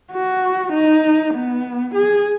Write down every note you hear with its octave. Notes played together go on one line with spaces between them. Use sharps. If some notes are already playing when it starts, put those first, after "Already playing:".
F#4
D#4
B3
G#4